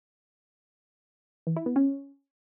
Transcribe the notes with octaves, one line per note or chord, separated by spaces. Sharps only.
E3
E4
B3
C#4